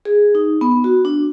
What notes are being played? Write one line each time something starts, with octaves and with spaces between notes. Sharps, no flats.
G#4
D#4
B3
F#4
D4